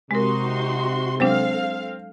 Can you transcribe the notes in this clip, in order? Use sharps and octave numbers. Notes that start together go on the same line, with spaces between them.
C3 G#3 D#4 F#4 A#4 C6
F#3 G#3 C4 D4 A4 F5